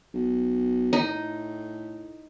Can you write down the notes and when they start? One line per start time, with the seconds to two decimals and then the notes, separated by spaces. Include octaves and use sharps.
0.14 B1
0.93 A2 D#4